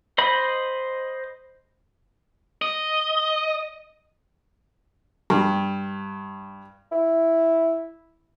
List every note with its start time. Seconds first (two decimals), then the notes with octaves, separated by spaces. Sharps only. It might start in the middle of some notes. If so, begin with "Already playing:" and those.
0.18 C5 D#5 B5
2.62 D#5
5.30 G2
6.92 E4